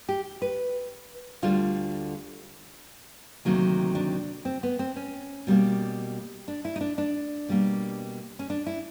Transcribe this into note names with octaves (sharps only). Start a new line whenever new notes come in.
G4
B4
D2 D3 G3 F4
D2 C3 D#3 F#3 A#3
D4
C4
B3
C4
C#4
B2 G3 A#3
D4
E4
D#4
D4
D4
B2 G3 A#3
C#4
D4
E4